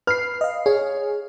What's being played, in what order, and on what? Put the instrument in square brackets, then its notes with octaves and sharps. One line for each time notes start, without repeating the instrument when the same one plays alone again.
[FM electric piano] B4 C7 [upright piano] F6
[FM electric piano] D#5 F5
[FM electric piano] G#4 [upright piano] C#5